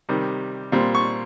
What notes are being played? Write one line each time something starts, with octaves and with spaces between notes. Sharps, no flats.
C3 D#3 G3
A#2 G3 C4
C#6